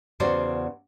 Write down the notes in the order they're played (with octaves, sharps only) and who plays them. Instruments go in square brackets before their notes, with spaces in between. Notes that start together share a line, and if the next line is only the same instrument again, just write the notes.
[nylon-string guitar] E2 C#3 F#4 C5 D5